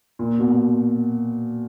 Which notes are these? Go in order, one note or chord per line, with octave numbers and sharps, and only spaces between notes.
A#2
B2